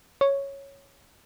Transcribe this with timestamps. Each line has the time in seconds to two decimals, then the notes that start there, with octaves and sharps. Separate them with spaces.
0.21 C#5